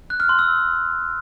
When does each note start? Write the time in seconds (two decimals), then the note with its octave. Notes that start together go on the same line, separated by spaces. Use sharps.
0.10 F#6
0.20 F6
0.29 C6
0.39 E6